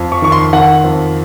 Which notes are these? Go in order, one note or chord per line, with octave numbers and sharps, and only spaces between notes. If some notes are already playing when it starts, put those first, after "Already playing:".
Already playing: F2
C#6
D#3 C#6
C6
D#3 F#5
F2